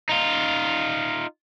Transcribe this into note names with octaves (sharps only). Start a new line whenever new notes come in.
D#4 F4